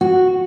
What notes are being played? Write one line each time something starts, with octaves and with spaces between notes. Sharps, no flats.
F#4